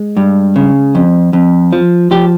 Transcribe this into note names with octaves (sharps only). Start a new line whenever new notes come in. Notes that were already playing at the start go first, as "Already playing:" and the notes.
Already playing: G#3
G2
C#3
F2
F2
F3
F3 G4